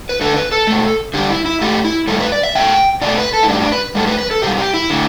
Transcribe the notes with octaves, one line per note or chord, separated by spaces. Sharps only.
B4
D3 A3 A4
B4
A4
B2 A3
D3 G3 G4
E4
E4
A2 A3 G4
E4
A2 G3 A4
B4
D5
E5
B2 A3 G5
B2 A3 D5
B4
A4
E4
A2 G3 D4
D4
B4
A2 G3 A4
B4
B4
A4
B2 G3 G4
G4
E4
D3 A3